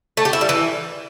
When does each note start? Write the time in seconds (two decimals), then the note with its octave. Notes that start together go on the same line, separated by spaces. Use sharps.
0.17 A3
0.25 G4
0.33 E4
0.41 G3
0.49 E3